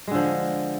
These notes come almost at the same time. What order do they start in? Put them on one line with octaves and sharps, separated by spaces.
G#3 D3 F3